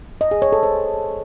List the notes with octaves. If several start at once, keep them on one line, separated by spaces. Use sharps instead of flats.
D#5
G#4
C#5
A4
C5